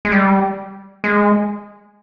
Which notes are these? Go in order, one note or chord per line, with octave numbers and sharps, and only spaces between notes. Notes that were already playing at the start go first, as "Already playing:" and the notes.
G#3
G3
G#3